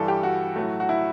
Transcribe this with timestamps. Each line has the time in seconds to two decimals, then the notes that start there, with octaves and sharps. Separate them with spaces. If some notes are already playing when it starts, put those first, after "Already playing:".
Already playing: G2 E3 G3 A4
0.08 G4
0.23 F#4
0.56 A2 F#3 A3
0.80 F#4
0.89 E4